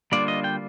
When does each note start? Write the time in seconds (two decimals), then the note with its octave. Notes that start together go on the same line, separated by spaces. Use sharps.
0.12 D3 G3 A#3 D4 F4 D5
0.28 D#5
0.44 G5